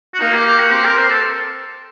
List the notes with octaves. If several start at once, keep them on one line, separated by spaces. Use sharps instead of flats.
F#4
A#3 D#4
G4
G4
F#4
C4 G4
A#4
C5
A4